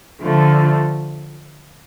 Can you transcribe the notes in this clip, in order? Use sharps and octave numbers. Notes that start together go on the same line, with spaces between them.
D3 F3 A3